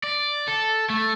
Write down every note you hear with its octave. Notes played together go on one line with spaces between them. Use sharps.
D5
A4
A3